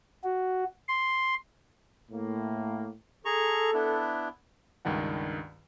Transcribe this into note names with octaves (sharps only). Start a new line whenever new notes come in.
F#4
C6
A2 A#3
G#4 A4 A#5 C#6
B3 D4 E4
C#2 G2 D#3 D4 F#5